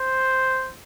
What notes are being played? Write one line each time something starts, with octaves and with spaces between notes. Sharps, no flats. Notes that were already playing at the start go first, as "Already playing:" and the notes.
Already playing: C5